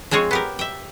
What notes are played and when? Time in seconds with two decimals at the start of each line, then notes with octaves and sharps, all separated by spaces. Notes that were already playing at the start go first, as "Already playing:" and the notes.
0.11 F3 G#3 C4 G#4 C#5
0.31 B3 G4 A#4
0.59 E5 G5